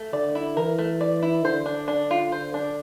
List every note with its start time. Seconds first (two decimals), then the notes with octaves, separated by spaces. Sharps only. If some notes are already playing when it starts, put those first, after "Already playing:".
Already playing: A3
0.13 D3 D5
0.35 E4
0.57 E3 A#4
0.79 A3
1.01 D5
1.22 E4
1.44 D3 C5
1.66 D4
1.88 D4
2.11 F4
2.32 C5
2.54 D4